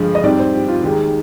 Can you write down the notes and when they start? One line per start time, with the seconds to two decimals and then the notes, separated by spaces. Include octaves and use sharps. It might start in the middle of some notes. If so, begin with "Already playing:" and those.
Already playing: G2 D3 F3 G#3
0.15 D#5
0.23 G#2 G3 C4 D5
0.39 C5
0.54 G4
0.68 F4
0.83 D#2 D#3 G#3 G4